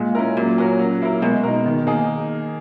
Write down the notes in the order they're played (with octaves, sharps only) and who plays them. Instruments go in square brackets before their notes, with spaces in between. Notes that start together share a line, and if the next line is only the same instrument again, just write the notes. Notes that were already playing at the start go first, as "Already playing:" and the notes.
Already playing: [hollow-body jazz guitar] A#2 [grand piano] G#3
[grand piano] C#4 E4 A#4
[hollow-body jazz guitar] A#2 [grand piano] F#3
[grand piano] C#4 F#4 A#4
F#3
A#3 E4 A#4
[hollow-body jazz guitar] B2 [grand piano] G#3
[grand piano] D#4 A#4
D#3
A#3 D#4 G#4